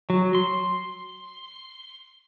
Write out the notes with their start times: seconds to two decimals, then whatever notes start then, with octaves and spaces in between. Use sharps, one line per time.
0.10 F#3
0.35 C6